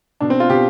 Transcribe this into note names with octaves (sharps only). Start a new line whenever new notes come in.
B2 D4
C4
F4
B2 G4